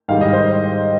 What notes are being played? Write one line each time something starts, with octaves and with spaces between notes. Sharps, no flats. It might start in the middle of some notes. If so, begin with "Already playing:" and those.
G#2 D#3 G3 F5
D#5
C5